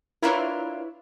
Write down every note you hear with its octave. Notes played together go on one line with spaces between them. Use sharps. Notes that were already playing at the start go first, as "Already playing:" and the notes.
D4 E4 F4 A#4 B4 C#5